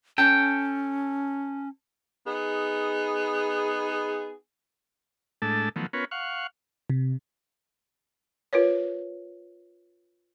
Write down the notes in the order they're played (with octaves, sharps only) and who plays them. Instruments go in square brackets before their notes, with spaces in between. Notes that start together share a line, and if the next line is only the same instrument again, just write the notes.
[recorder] C#4 [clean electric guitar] A4 G5
[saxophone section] B3 D#4 G#4
[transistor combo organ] A2 G#3 A3 D4 A4 A5
D#3 F3 F#3 A3 B3
B3 C#4 F4 A#4 B4 C#5
F5 F#5 C#6
[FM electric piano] C3
[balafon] F4 A#4 B4 C#5